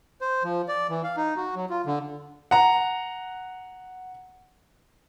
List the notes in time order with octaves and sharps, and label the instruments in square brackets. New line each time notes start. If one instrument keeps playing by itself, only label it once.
[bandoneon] C5
F3
D5
E3
F5
D#4
F#4
F#3
F4
D3
[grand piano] F#5 A#5